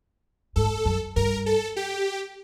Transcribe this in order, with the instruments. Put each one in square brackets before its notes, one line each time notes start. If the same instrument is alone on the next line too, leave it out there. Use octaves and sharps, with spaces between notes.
[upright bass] G#2 [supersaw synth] A4
[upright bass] F#2
[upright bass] G2 [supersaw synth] A#4
[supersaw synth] A4
G4